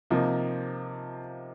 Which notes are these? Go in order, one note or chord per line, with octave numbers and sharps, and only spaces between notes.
C3 F3 A#3 D#4